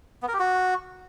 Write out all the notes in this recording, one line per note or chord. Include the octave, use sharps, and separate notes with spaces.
B3
A#4
G4
F#4